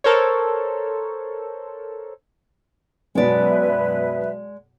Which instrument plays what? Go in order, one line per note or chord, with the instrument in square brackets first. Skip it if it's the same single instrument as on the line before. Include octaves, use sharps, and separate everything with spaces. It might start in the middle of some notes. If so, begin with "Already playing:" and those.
[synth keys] A4 A#4 C5 C#5
[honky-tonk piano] F#2 B2 F#3 [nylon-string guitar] G#3 D5 [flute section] B4 E5